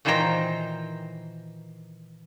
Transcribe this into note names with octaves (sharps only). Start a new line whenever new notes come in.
A#2 D#3 E3 C5 G5 A#5